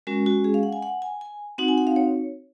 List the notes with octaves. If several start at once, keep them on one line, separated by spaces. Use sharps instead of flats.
G#3 C#4 F#4 A#4
F#4
G#4
F5
F#5
G#5
F#5
G#5
G#5
C4 D#4 F#4 F#5
G#5
F#5
F5
C#5